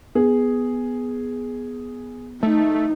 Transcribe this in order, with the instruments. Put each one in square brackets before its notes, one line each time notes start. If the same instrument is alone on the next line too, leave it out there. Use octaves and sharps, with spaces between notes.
[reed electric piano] B3 [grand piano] G#4
[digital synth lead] A3 [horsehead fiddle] D#4